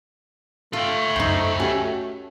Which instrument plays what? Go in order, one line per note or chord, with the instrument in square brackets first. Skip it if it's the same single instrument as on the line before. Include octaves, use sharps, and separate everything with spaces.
[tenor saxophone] A3 [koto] F4 [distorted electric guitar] A4 G5
[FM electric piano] C#2 F#2 [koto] D#4 C5
[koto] C#4 [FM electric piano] F#4 G4